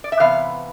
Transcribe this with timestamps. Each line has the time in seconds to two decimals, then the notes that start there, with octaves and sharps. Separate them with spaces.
0.04 D5
0.12 E5
0.20 C3 E3 B3 F5